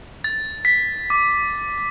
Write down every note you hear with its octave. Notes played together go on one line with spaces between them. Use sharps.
A6
B6
D6